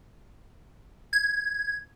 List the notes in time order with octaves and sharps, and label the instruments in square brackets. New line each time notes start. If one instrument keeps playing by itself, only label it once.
[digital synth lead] G#6